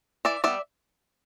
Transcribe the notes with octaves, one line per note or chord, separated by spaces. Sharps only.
E3 D5 E5
G3 B3 D5 E5